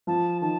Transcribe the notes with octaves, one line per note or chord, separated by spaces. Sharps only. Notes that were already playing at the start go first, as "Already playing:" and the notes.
F3 A5
D#3 A5